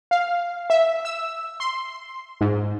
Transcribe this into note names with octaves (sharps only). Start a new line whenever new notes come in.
F5
E5
E6
C6
G#2